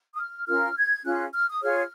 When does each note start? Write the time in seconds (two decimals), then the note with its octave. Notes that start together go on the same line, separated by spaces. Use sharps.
0.15 D#6
0.18 F6
0.47 C#4 F4 A#4 F6
0.76 G#6
1.04 C#4 F4 G#4 F#6
1.34 F6
1.49 D#6
1.62 F4 G#4 C#5 F6